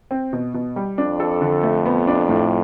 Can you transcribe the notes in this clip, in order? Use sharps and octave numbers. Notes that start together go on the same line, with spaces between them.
C4
B2
B2
G3
F2 D4
A4
D3
A3
B3
D4
A2